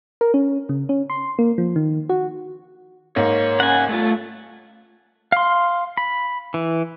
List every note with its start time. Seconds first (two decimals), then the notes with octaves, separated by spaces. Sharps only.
0.21 A#4
0.34 C#4
0.69 C#3
0.89 C#4
1.10 C6
1.39 A#3
1.58 F3
1.76 D#3
2.09 F#4
3.16 G#2 A#3 C#5
3.60 C#3 F#5 G#5
3.89 G2 A3 F4
5.32 F5 C6
5.97 B5
6.54 E3